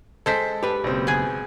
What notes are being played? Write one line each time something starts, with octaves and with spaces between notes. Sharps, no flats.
G#3 A4 C5 G5 B6
G4 B4
F#1 B1 C4
B3 G#4 G#5